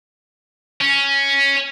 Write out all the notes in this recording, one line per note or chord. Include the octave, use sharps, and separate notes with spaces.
C#4